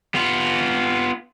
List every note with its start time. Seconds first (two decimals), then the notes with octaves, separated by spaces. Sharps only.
0.15 B3 F4